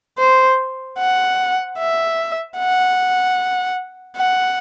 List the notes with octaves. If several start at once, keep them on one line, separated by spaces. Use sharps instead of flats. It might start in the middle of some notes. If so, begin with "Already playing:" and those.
C5
F#5
E5
F#5
F#5